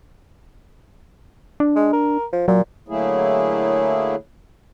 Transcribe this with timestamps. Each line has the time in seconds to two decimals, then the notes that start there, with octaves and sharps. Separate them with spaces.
1.60 D4
1.76 G#3
1.93 A#4
2.33 F3
2.48 A#2 F#3
2.88 D3 F#3 A3 A#3 E4 G#4